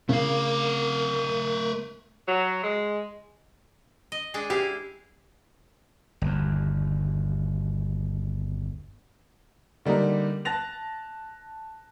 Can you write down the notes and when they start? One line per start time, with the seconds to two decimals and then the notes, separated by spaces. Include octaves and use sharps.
0.09 C#3 A3 A#4 F5
2.27 F#3
2.63 G#3
4.12 D#5
4.34 G#3 D4 G#4
4.50 E4 G4 G#4 F5
6.22 G1 D#2
9.85 D3 G3 A#3 D#4 A#4
10.45 A5 F#6 A6 A#6 F7